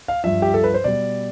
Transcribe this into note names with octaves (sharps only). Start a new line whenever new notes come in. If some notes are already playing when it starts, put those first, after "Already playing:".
F5
G2 F3 E5
G4
A4
B4
C5
B2 G3 D5